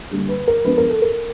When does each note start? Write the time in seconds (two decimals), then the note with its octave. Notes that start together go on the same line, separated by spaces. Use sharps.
0.11 D3 G3 A#3
0.29 B4
0.47 A#4
0.64 F3 G#3 B3 D4 B4
0.78 A#4
0.90 A4
1.02 A#4